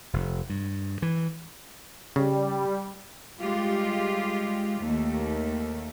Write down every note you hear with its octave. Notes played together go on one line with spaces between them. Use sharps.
F1
G2
E3
C#3 G3
G3 G#3 F4 G4
D#2 A3